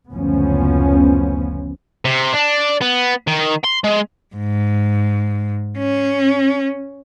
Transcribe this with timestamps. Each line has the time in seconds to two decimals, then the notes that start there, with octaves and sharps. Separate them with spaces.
0.11 F#1 D2 F3 B3 C#4
2.05 C3
2.33 D4
2.82 B3
3.27 D#3
3.64 C6
3.84 G#3
4.36 G#2
5.78 C#4